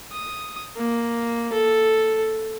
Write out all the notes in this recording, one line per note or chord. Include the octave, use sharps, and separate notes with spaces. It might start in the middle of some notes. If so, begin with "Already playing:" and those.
D#6
A#3
A4